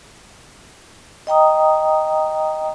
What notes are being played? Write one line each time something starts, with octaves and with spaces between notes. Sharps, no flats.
D#5 G5 A#5 D#6